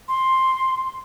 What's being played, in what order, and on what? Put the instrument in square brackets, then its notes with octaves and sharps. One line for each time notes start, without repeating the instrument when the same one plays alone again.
[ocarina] C6